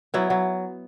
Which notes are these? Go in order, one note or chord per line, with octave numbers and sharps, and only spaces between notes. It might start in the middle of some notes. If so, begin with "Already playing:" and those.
F#3 B3 E4
F#3